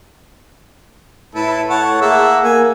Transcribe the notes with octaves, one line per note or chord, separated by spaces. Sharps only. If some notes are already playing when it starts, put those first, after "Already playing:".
A2 E4 A4 B4
C#5 F#5 A5
A#3 G#4 E5 F#5
A#3 G#5